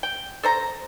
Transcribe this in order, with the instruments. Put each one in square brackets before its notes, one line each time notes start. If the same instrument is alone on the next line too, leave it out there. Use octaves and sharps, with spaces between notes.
[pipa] G5
A4 C5 A#5